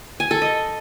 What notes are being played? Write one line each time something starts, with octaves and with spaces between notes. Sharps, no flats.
G#5
A4
D#5